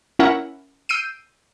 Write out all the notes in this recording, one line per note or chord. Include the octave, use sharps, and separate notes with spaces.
C#4 E4 A#4 E5 F#5
E6 G6 C7 D7 D#7